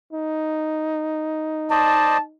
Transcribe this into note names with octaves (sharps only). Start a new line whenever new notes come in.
D#4
C5 D5 D#5 A5